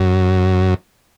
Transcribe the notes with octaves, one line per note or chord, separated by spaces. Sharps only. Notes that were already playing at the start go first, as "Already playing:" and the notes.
Already playing: F#2